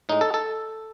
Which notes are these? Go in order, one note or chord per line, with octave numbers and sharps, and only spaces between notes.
A2 G#3 D#4
A4
A4